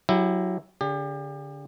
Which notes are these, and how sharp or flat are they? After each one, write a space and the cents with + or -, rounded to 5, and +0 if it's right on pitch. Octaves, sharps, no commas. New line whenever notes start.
F#3 +0 E4 +0 G4 +30
D3 -30 G4 +35